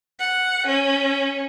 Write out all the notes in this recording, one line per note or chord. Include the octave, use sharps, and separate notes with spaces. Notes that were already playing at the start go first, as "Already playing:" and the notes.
F#5
C#4